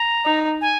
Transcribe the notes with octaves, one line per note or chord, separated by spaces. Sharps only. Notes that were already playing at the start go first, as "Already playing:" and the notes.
Already playing: A#5
D#4
G#5